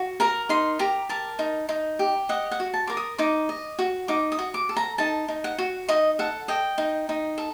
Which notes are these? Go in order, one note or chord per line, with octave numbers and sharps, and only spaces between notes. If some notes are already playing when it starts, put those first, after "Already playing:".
Already playing: F#4
A#4 A#5
D#4 C6
G4 A#5
A#4 A5
D#4
D#4
G4
D#5 F#5
F#5
F#4
A5
A#4 D6
D#6
D#4 D6
D#5
F#4
D#4 D6
D#6
F#4
D6
A4
A#5
D#4 A5
D#4
F#5
F#4
D#4 D#5
A4 F#5
D#5 G5
D#4
D#4
A4